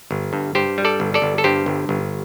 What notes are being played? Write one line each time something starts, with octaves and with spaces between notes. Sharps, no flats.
G1
G2
G2 G4 C5
G3
A4 D5
G1
A4 D5
G1
A4
G2 G4 C5
G1
G1